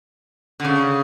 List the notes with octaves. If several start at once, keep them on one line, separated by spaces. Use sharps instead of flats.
D3
C#3